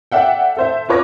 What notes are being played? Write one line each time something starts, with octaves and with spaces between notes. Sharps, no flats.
A4 D5 E5 F#5 G5
A4 C5 E5
F4 B4 C#5 D6 A#6